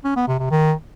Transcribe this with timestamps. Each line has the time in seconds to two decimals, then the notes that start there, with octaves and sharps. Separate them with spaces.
0.05 C#4
0.16 B3
0.28 C3
0.39 C3
0.51 D#3